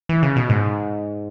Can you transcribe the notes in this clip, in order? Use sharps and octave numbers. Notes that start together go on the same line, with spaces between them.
E3
C#3
B2
G#2